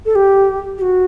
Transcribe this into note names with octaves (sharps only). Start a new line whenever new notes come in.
A4
G4
G4
F#4